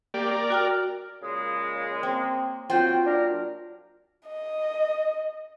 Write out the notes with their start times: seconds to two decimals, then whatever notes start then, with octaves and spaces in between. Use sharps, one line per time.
0.14 A#3 G4 D5
0.31 A#4 D5
0.50 F#4 G5 F6
1.22 A#2 C#3 G#3
2.03 A#3 C4
2.70 F#3 C4 F4 G5
3.06 A#2 D4 A#4
4.27 D#5